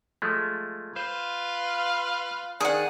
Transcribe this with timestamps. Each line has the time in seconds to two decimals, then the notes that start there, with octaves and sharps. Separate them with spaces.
0.22 F3 G#3 A3
0.96 F4 B4 C5 F5
2.61 D#3 G#4 D5 F#5